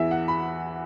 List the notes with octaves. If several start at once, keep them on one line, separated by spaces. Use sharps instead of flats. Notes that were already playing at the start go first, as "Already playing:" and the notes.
Already playing: E2 E3 E5
F#5
B5